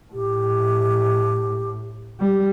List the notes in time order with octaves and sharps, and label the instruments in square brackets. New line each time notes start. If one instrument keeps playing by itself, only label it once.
[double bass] A2 [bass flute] G4
[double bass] G3